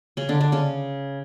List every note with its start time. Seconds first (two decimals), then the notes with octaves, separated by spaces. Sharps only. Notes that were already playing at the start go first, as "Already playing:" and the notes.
0.17 C#3 C#4
0.29 D3 D4
0.41 D3 D4
0.52 C#3 C#4